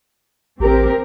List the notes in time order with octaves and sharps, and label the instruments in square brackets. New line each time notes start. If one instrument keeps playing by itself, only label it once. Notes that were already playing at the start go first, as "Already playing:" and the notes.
[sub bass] A1 [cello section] C4 G4 A#4